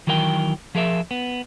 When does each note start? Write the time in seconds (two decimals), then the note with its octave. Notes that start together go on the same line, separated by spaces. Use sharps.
0.07 D#3 E3 F#3 A#4 D#5 G5
0.75 F3 G#4 A#4 E5
1.11 B3